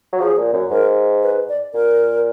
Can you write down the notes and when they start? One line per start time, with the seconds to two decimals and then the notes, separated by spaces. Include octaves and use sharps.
0.13 F#3
0.20 F3 G#4
0.37 A#2
0.54 F#2
0.71 G#2 A#4
1.23 B4
1.49 D5
1.74 A#2 A#4